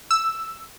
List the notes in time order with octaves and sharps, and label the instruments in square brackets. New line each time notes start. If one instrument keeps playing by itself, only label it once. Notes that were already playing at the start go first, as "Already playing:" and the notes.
[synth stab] E6